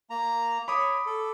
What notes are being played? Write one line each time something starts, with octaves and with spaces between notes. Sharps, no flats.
A#3 A#5
C#5 B5 D6 D#6
A4